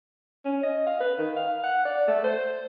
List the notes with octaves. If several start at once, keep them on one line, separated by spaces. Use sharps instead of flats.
C#4
D#5
F5
B4
D#3
F5
F#5
D5
A3
C5